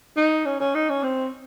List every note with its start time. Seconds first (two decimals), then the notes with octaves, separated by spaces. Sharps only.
0.17 D#4
0.45 C#4
0.60 C#4
0.74 D#4
0.89 C#4
1.03 C4